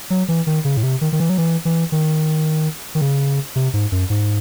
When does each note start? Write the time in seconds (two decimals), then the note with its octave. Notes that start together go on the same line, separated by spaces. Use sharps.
0.10 F#3
0.28 E3
0.47 D#3
0.65 C#3
0.77 A2
0.83 C3
1.01 D#3
1.13 D#3
1.20 E3
1.29 F#3
1.38 E3
1.65 E3
1.92 D#3
2.95 D#3
3.01 C#3
3.56 C3
3.74 G#2
3.92 F#2
4.10 G#2